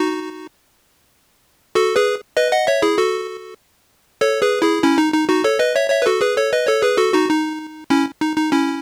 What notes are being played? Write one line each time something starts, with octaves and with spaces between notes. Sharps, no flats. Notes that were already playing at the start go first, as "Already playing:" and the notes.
Already playing: D#4 F#4
F#4 A4
G#4 B4
B4 D#5
D#5 F#5
C#5 E5
E4 G#4
F#4 A4
A4 C#5
G#4 B4
E4 G#4
C#4 E4
D#4
D#4
D#4 F#4
A4 C#5
B4 D#5
C#5 E5
C#5 E5
B4
F#4 A4
G#4 B4
A4 C#5
B4 D#5
A4 C#5
G#4 B4
F#4 A4
D#4 F#4
D#4
C#4 E4
D#4
D#4
C#4 E4